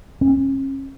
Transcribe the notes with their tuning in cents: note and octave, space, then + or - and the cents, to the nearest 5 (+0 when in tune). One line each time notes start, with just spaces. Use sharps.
C#4 -35